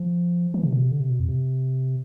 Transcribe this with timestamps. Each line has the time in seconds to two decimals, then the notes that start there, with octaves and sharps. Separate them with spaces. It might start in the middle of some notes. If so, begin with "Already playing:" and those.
Already playing: F3
0.54 E3
0.63 C3
0.73 B2
0.82 C3
0.92 D3
1.00 C3
1.10 B2
1.20 F2
1.29 C3